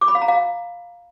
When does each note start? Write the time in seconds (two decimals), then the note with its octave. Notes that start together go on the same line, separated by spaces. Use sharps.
0.01 D6
0.08 B5
0.15 F5
0.22 A#5
0.28 F5